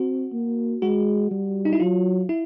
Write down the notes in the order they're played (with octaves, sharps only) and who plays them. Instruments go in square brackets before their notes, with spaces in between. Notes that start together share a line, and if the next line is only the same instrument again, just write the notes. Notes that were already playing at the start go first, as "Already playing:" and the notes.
Already playing: [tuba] C4 [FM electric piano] F#4
[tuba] A#3
[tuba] G#3 [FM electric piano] F#4
[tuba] G3
[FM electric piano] D#4
E4
[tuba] F#3 [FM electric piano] F4
[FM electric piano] E4